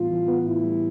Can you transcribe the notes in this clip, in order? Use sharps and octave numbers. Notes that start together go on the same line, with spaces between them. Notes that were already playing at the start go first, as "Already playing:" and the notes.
Already playing: A2 E3 G3 B3 F4
E3
B3
A2 E4
G3